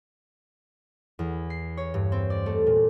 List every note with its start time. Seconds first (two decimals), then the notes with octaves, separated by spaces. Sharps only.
1.19 E2
1.50 C7
1.77 C#5
1.94 G2
2.12 C4
2.30 D5
2.46 A3
2.67 A#2